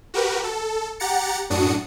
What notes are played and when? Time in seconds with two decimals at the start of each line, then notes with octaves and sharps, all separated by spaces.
0.14 F#4 G4 A#4 B4
0.44 A4
1.00 G4 F#5 A#5 A6 C#7
1.50 F#2 A2 D4 F#4 D#6 C#7